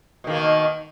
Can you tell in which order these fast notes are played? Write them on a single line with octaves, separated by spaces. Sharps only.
B2 D#3 A#3